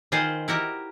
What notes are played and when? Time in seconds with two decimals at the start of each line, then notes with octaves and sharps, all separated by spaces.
0.12 D#3 F4 G#4 B4 C5 D#5
0.48 E4 F#4 G4 A#4 E5